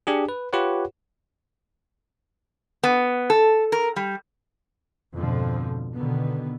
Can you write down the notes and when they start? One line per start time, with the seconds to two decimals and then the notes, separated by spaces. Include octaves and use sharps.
0.07 D4 G4 G#4
0.29 B4
0.53 F4 G4 B4 C#5 F#5
2.83 B3
3.30 A4
3.72 A#4
3.96 G3
5.13 F2 G#2 B2 D3 F3
5.93 B2 D3 D#3 B3